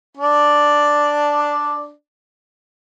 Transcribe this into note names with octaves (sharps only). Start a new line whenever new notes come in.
D4 D5